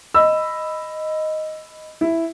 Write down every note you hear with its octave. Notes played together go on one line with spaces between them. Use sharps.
D#5 B5 E6
E4